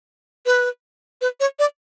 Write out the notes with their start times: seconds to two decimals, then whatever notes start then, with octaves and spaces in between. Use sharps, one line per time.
0.46 B4
1.21 B4
1.40 C#5
1.59 D5